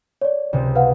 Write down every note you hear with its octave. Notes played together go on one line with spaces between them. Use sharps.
C#5 D5
C#2 C3
B4 F5 F#5